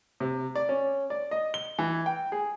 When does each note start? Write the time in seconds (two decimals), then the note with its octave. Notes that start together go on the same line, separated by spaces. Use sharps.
0.20 C3
0.55 D5
0.69 C#4
1.10 D5
1.31 D#5
1.54 G7
1.79 E3
2.06 G5
2.32 G#4